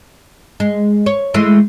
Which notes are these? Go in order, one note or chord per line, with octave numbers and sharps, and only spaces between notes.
G#3
C#5
E3 G#3 A3